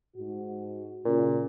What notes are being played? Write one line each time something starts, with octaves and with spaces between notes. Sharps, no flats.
G#2 F#4
A#2 C#3